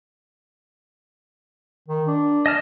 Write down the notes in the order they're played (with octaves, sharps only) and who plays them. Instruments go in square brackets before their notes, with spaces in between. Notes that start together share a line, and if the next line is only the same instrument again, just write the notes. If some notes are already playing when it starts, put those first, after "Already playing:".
[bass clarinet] D#3
D4
[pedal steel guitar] D#5 A5 F6